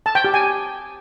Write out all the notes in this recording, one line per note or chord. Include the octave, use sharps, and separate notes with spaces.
A5
G5
G4
G#5